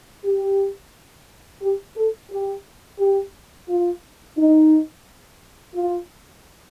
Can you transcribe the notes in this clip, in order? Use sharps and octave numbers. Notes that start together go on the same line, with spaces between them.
G4
G4
A4
G4
G4
F4
D#4
F4